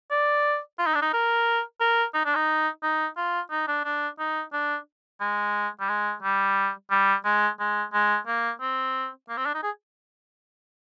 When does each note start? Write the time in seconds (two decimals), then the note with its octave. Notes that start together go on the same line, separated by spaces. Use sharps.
0.11 D5
0.78 F4
0.86 D#4
0.95 D4
1.02 D#4
1.13 A#4
1.80 A#4
2.14 D#4
2.25 D4
2.35 D#4
2.83 D#4
3.17 F4
3.51 D#4
3.67 D4
3.84 D4
4.19 D#4
4.53 D4
5.21 G#3
5.80 G3
5.89 G#3
6.22 G3
6.91 G3
7.25 G#3
7.59 G#3
7.93 G#3
8.27 A#3
8.61 C4
9.29 A#3
9.37 C4
9.46 D4
9.55 D#4
9.63 G#4